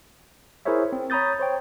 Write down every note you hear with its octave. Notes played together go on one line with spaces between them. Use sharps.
E4 G#4 A#4 C5 C#5 E5
C4
C#5 A#5 B5 D#6 G6 A6
C5 C#5 G5